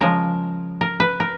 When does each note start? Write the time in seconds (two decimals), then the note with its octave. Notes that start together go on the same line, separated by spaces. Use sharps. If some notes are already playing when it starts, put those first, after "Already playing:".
0.01 C#3 F3 G#3 A#4
0.81 A#4
1.00 B4
1.20 A#4